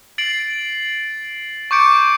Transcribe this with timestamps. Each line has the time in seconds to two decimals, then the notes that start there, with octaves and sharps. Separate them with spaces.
0.18 A6 C7 D7 F#7
1.71 C#6 D6 G6 C#7 D7